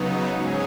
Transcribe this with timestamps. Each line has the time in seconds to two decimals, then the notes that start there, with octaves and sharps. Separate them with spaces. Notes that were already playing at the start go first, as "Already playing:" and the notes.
Already playing: C#3 F#3 B3 D#4
0.29 G#2 F#3 C#4 G#4 C#5